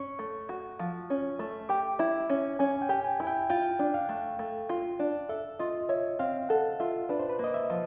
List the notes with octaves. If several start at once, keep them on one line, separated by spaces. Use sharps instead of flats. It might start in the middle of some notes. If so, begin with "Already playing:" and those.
Already playing: C#4 C#6
A3
F#4
F3
C#4
A3
G4 D6
E4
C#4
C#4 G#5
G5
G4
G#5
E4
G5
F4 G5
D4
F5
A3
A3
F4
D4
A4 E5
F4 D#5
C#5 E5
C4 F5
A4 F#5
F4 E5
D4 B4
C5
B4
A#3
D#5
E5
F3